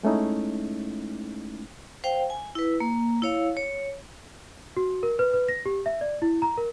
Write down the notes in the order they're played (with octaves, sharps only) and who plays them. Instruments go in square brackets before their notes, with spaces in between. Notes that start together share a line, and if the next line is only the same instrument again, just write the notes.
[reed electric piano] G#3 A3 C#4 D#4 E4
[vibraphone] C5 F5 G5
G#5
E4 B4
A#3
E4 C#5 F5
C#5
[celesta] F#4
A#4
B4
B4
A#6
G4
E5
D5
E4
A#5
A#4